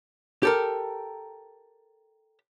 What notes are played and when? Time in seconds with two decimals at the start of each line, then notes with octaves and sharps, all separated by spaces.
0.43 G4 A4 A#4